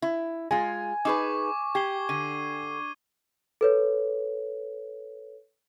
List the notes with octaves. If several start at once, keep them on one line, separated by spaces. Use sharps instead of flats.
E4
G#3 F4 G#5
D#4 G#4 B4 C#6 D6
G4 G#6 C7 G7
D3 D#7
A4 B4 C#5